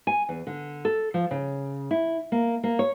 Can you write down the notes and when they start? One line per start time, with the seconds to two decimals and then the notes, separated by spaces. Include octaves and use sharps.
0.07 G#5
0.29 E2
0.47 D3
0.85 A4
1.14 F3
1.31 C#3
1.91 E4
2.32 A#3
2.64 A#3
2.79 C#5